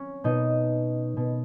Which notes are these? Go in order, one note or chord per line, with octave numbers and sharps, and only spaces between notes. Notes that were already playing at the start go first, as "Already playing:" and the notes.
Already playing: C#4
B2 D#4
B2